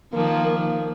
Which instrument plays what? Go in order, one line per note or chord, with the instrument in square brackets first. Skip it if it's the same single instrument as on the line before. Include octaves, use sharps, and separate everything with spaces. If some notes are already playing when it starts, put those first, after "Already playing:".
[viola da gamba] D#3 F3 [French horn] A#3
[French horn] A#3